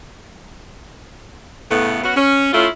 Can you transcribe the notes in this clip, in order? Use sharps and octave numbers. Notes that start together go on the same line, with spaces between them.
A2 C#3 A3 B3
B3 C#4 F#4
C#4
A3 C#4 E4 F4